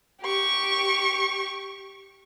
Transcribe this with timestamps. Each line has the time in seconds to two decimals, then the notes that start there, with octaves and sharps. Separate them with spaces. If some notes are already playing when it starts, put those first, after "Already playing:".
0.22 G4 C#6